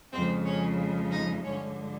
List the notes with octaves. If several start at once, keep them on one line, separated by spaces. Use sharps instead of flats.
F2 C#3 F3 G#3 C4 C5
C#4 C#5
D#4 D#5
G2 D3 F3 G#3 C#4 C#5